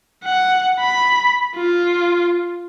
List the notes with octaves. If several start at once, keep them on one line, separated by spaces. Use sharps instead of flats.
F#5
B5
F4